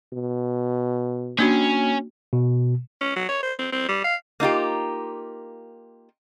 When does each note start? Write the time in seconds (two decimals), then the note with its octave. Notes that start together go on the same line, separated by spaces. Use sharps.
0.13 B2
1.39 A#3 C#4 D4 F#4
2.33 B2
3.01 C#4
3.16 F#3
3.28 C#5
3.43 C5
3.59 C4
3.72 C4
3.89 G3
4.04 F5
4.40 A#3 D#4 F4 G4